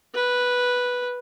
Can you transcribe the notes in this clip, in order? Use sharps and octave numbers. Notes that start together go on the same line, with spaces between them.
B4